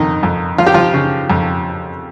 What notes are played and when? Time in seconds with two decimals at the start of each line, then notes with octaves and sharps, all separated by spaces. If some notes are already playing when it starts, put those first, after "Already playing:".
Already playing: F2 D#3 D#4
0.23 F2
0.58 F3 F4
0.66 G4
0.74 F3 F4
0.94 C#3
1.30 F2